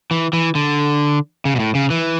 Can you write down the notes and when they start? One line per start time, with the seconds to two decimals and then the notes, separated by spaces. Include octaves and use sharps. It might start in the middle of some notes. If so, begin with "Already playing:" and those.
0.11 E3
0.33 E3
0.55 D3
1.45 C#3
1.56 B2
1.60 A2
1.75 C#3
1.90 E3